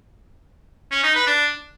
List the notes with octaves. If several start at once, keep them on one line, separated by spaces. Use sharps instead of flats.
C#4
D#4
B4
D4